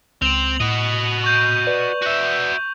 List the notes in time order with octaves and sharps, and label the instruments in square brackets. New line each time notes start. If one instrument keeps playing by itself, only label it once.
[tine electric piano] C#2 [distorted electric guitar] C4 [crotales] F7 F#7
[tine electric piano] A2 [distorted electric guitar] F#4 D#5
[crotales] C#6 G6
[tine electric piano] B4 D5
[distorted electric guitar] F#4 E5